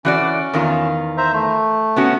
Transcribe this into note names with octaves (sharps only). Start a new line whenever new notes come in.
E3 C#4 F#4 D5
E2 D#3 F4
C5 E5 A#5
A3
B3 C#4 F#4